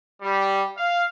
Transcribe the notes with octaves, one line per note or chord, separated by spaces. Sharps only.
G3
F5